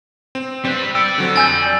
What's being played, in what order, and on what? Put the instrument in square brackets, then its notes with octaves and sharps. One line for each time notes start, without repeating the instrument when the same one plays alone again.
[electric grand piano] C4
[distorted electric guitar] G3 B4 [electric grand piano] C4
[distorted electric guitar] D5 G5 [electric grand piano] E6 C#7
[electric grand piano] D3 F#3 C4
[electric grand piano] F2 E6 G6 [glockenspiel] G#5 A6